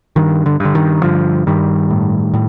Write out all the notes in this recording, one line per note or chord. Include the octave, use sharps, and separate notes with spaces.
G2 D#3
D3
G2 D3
D#3
G2 D3 F3
G2 D#3 G3
A2
A2